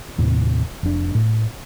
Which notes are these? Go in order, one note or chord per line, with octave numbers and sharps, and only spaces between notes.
D#2 A2 C3
F1 D4
A2